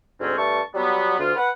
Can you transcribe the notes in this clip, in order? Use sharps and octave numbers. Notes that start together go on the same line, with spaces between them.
D2 G#2 C4 C#4
G2 A3 A5 C#6
F#3 G3 B3
D2 F4
B4 F#5